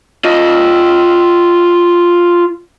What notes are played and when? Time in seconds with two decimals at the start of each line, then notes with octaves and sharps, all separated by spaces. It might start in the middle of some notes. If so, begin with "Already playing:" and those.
0.25 F4 D#5